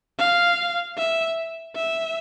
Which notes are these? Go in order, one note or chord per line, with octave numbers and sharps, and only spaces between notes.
F5
E5
E5